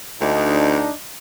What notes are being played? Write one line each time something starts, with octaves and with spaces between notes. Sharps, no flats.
D2 D4 D#4